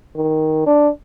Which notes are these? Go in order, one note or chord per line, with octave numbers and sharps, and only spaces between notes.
D#3
D4